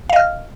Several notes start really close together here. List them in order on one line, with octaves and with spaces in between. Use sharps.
F5 D#5 F6